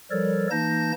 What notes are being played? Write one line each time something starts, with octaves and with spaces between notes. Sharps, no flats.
F3 G3 A4 A#4 C#5 D5
E3 A#3 D#4 A5 G6 A#6